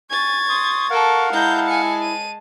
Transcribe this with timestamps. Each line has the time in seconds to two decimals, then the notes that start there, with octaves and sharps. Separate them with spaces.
0.11 G#5 C#6 G#6 A6
0.49 C6 D#6
0.90 A4 A#4 F5 F#5
1.33 G#3 E4 A5 A#5 G6
1.68 G#5 C#7
2.02 D#7